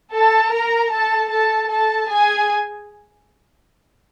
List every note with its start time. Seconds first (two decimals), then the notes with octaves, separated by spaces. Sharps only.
0.12 A4 A5
0.51 A#4 A#5
0.91 A4 A5
1.29 A4 A5
1.69 A4 A5
2.08 G#4 G#5